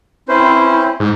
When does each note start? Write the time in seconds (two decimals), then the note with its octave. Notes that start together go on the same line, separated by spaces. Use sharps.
0.29 C4 C#4 E4 B4 C5
1.00 G#2